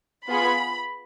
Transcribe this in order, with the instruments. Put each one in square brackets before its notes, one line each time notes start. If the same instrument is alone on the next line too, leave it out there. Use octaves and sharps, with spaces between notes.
[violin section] B3 F4 G#4 B5